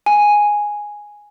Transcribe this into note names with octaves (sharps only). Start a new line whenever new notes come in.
G#5